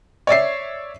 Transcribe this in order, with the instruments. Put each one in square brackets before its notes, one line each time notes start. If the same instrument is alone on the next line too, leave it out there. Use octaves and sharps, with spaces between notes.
[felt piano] C#5 D5 E5 C7